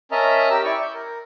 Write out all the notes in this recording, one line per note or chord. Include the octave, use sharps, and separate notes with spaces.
C#4 A#4 D#5 E5 A5 A#5
G4 A#4 E6
E4 D5 C#6
G6
A#4